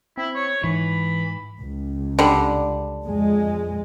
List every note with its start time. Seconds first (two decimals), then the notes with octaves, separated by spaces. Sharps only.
0.17 C4 E4
0.35 C#5
0.64 G#2 E3 B5
1.60 C#2
2.19 D3 G3
3.04 F2 G#3